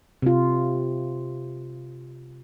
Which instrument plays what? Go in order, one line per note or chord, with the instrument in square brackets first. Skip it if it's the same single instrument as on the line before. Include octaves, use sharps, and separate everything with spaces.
[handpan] C3 F4